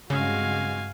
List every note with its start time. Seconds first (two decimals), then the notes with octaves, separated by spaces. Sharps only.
0.10 G2 C#3 G#3 C4 F#4 F5 G#5